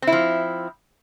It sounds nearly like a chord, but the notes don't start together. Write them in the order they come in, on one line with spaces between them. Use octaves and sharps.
C4 E4 F3